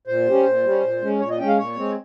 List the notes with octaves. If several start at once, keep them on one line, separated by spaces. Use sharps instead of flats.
A#2 C5
G3 C#4
A#2
G3 C#4
A#2
G#3 C#4
A#2 C#5
D#5
G#3 C#4 G5
F5
A#2 C#5
G#3 C4